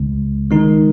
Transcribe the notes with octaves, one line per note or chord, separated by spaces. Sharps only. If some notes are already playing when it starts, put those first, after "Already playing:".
Already playing: C#2 C#3 G#3
D#3 G#3 D#4 A#4